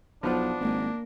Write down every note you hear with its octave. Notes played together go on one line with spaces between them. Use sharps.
B1 F3 B3 D4 F4
G#1 A#3